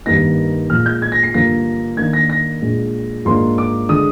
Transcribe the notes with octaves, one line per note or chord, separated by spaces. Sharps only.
G2 D#3 A#3 D#4 A#6
A#2 F3 G#3 F6
G6
G#6
A#6
C7
G2 D3 F3 A#3 D4 A#6
D#3 A#3 D4 G#6
A#6
A#6
A#2 G#3 D4
G#2 F3 A#3 D4 C6
D6
D3 G#3 D4 D#6